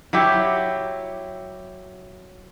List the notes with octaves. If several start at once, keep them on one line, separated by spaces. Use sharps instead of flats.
F#3 E4 G4